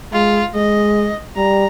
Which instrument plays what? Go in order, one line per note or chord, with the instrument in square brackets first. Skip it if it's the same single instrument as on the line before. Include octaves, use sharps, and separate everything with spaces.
[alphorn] G#3 [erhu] F4
[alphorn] G#3 [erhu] D#5
[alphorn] G3 [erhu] A#5